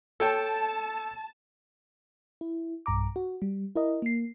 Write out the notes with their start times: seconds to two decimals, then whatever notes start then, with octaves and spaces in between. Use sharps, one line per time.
0.20 A4 C#5 G5 A5
2.41 E4
2.86 B1 G2 A#5 D6
3.16 F#4
3.42 G3
3.75 E4 A#4 D#5
4.02 A#3 C7